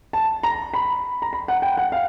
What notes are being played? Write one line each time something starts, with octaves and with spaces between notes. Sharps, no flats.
A5
A#5
B5
A#5
B5
F#5
G5
F#5
F5